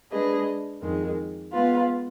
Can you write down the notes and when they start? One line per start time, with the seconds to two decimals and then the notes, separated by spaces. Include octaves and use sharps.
0.11 G#3 D4 G#4 B4 D#5
0.82 F2 D#3 G#3
1.52 G#3 B3 F4 B4